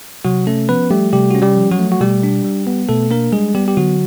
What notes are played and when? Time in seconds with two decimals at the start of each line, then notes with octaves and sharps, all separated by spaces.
0.25 C3 F#3 F#4
0.47 A3 C#4 A4
0.69 F3 B3 B4
0.91 G3 A3 G4
1.13 C3 G3 G4
1.30 C#4 F#4
1.42 G3 G4
1.57 F3
1.71 F#3 F#4
1.79 A3
1.92 F#4
2.01 B2 G3 G4
2.23 D4
2.45 G3
2.67 B3
2.89 B2 A3 A4
3.11 A#3 D4 A#4
3.32 G3 G#3 G#4
3.55 G3 B3 G4
3.68 G4
3.77 D3 F#3 F#4